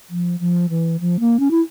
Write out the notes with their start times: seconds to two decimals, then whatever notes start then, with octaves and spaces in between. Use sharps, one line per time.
0.10 F3
0.40 F3
0.69 E3
1.00 F3
1.20 A#3
1.40 C#4
1.51 E4